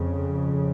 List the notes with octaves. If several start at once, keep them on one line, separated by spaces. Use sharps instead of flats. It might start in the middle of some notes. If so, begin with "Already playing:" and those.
Already playing: F2 C#3